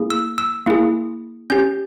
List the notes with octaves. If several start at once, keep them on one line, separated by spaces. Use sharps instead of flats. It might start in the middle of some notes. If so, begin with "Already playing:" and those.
Already playing: A#3 E4 G#4
E6
E6
A#3 E4 G#4
C#4 G4 G6